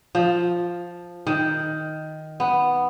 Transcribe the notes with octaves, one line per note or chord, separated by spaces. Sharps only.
F3
D#3
B3